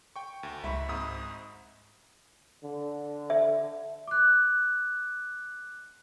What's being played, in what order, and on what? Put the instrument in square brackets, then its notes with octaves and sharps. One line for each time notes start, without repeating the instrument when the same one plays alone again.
[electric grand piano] G5 C#6
D2
[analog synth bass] C#2 [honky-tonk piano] G#2 [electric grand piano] E5 B5 C#6
[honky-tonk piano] G#1 G#2 D#6
[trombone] D3
[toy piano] E5
[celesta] D6 F#6